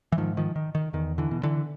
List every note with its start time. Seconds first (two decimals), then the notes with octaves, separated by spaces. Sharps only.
0.12 E3
0.17 G#2 D#3 F3
0.37 D#3 F3
0.56 D#3
0.75 D#3
0.93 E2 D#3
1.18 D3 E3
1.31 B2
1.43 D3 E3